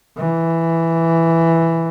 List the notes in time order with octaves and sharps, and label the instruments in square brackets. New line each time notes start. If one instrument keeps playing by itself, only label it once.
[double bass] E3